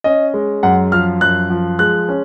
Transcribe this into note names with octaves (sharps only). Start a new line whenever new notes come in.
C#4 D#5
G#3
F#2 F#5
F3 F6
F#2 F#6
F3
G#3 F#6
C#4